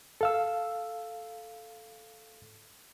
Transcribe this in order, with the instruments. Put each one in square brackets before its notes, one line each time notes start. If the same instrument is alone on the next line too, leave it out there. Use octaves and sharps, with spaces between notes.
[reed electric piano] A4 F5 E6